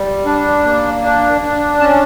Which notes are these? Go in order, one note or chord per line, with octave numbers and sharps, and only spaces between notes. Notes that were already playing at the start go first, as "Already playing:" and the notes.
Already playing: G3
D4
A#3
D4
D4
C#4 A5